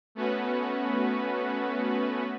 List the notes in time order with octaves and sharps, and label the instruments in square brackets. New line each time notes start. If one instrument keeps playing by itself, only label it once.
[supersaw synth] A3 B3 C#4 F#4 B4